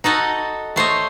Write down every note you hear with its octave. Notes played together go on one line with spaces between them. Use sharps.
D#4 F#4 A4 D#5
A3 C5 C#5 D#5